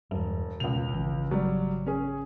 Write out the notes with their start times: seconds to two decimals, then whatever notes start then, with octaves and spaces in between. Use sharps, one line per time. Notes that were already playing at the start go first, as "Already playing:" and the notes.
0.11 E1 E2 G2
0.60 D#1 C#2 B2 F7
0.92 G#1 C#3 E3
1.31 F#3 G3
1.87 C#4 G#4